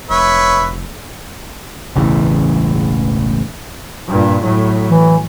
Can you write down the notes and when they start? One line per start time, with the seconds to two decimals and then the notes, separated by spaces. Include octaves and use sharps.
0.10 F1 B4 C#5 E5
1.96 E1 A1 C#3 E3
4.08 G2 A#2
4.43 A2 F#3
4.89 E3